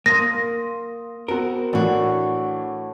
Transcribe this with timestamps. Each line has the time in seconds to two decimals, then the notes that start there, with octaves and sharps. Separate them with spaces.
0.06 A#3 C6 D#6 A#6 D#7
1.28 B3 C4 F#4 A#4
1.73 A2 E3 D4 F#4